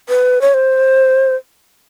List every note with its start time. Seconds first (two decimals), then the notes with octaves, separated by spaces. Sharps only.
0.09 B4
0.41 C#5
0.54 C5